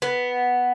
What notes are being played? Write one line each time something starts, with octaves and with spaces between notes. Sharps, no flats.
B3